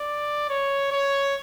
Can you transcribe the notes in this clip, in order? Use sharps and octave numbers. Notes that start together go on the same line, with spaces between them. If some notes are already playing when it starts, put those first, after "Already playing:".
Already playing: D5
C#5
C#5